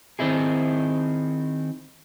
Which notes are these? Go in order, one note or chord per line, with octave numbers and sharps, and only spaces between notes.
D#3 C4 D#4 E4 G#4